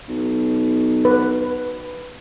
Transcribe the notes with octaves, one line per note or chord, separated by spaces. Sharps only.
B1
B4